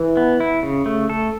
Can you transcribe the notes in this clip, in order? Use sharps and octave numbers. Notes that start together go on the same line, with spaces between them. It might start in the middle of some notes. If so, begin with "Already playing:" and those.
Already playing: E3
B3
E4
C#3
A3
A4